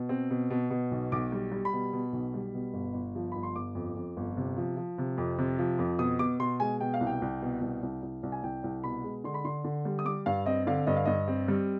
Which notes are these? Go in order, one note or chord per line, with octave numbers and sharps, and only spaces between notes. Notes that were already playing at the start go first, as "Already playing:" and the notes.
Already playing: B2
C4
B2
B2
B2
B1
B1 D6
G3
G3
B5
B2
B2
B1
G3
B2
G1
G1
F3
G1 B5
C6
G1 D6
F2
F2
G1
C3
F3
F3
C3
F2
C3
F3
F2
B2 D#6
B2 D6
B2 C6
G#3 G#5
B2 G5
F5
C2
G5
C2
B2
C2
C2
C2
C2
G#5
C2 G5
C2
B2 B5
G#3
D3 C6
B5
D3 C6
D3
G3
D#6
G3 D6
G2 F5
C4 D#5
D3 F5
G2 D#5
F5
G2 D#5
C4
G3